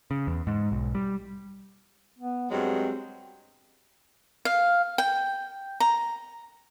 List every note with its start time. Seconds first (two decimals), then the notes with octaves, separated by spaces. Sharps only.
0.11 C#3
0.27 E2
0.47 G#2
0.72 B1
0.95 G3
2.19 B3
2.51 G2 F#3 G#3 C4
4.45 F5
4.98 G5
5.80 A#5